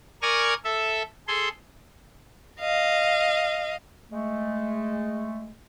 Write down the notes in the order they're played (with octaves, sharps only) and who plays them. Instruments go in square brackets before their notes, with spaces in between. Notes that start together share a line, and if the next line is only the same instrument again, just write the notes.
[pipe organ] A#4 D5 G#5 C#6 D#6 F6
A4 E5
G#4 A4 C6
[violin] D#5 F5
[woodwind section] G#3 A3